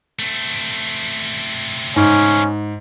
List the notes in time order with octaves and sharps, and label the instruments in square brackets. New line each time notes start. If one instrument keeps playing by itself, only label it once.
[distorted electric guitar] A3 C4
[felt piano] G#2 [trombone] C#4